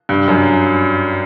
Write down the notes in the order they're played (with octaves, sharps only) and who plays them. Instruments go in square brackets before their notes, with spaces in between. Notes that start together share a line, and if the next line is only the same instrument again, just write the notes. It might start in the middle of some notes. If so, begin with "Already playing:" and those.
[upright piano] G2
F#2